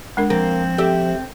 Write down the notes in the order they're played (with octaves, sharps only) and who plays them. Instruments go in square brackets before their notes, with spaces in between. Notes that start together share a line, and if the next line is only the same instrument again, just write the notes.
[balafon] G#3 D4 A#4
[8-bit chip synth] F3 [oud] A#3 [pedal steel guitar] C4
[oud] G4 E5 [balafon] A4